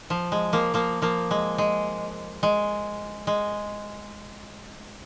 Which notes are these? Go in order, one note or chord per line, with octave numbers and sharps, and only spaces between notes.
F3
G#3
F3 A#3
F3 A#3
F3 A#3
G#3
G#3
G#3
G#3